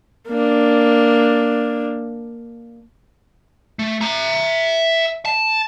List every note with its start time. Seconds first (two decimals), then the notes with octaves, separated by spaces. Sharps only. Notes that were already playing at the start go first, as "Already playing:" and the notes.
0.29 A#3 D4
3.79 A3
4.01 E5 A#5
5.25 A5